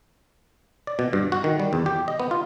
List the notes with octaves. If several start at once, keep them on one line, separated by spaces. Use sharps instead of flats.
D5
B2
G2
F#4
D#3
G3
E2
G4
D#5
B3
F4